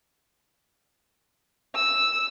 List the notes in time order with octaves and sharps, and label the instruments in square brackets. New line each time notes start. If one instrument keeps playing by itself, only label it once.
[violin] E6